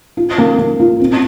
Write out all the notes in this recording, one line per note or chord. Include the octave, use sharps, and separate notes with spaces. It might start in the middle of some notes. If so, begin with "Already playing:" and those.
F4
A#3
A#3
F4
C4